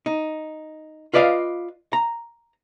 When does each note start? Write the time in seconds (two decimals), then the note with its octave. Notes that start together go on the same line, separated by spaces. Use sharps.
0.06 D#4
1.13 F4 B4 D5 D#5 F5
1.93 A#5